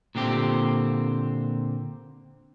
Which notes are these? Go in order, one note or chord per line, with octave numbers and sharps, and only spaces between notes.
A#2 D3 C4 G4